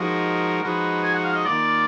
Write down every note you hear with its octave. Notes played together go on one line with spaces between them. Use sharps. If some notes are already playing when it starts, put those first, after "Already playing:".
Already playing: F3 G#3 D#4 F#4 A#4
F3 G#3 D#4 F#4 B4
G#5
F#5
F5
D#5
D#3 A#3 F4 D5